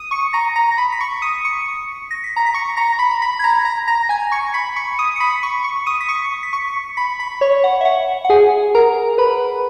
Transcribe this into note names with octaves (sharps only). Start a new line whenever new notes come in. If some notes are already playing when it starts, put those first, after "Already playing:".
Already playing: D#6 D#7
C#6 C#7
A#5 A#6
A#5 A#6
B5 B6
B6
C#6 C#7
D#6 D#7
C#6 C#7
A#6
B6
A#5 A#6
B6
C#6 C#7
A#5 A#6
B5 B6
B5 B6
G#6
A#5 A#6
A#5 A#6
A#5 A#6
G#5 G#6
C#6 C#7
B5 B6
C#6 C#7
D#6 D#7
C#7
B5 B6
C#6 C#7
C#6 C#7
D#6 D#7
B6
C#6 C#7
B6
C#6 C#7
B5 B6
B5 B6
C#5 C#6
F#5
E5
F#5
F#5
G#4 G#5
A#4 A#5
B4 B5